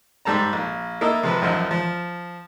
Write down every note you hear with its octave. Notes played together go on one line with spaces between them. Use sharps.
G#2 G3 A4 A5 A#5
A#1
A#3 E4 A4 D#5
C3 F3 B4
A1 F#2 F3 D#4
F3